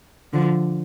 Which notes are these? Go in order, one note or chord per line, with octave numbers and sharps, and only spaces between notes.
D3 F3